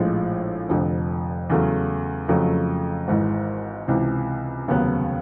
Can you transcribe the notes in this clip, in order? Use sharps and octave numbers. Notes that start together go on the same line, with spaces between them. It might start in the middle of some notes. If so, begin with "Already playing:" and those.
Already playing: A#1 A2 F3 G#3
F1 F2 D3
E2 C#3 F#3 A3
F2 C#3 F#3 A3
G#1 G#2 E3
C#2 C3 E3
F1 D#2 C#3 F#3 B3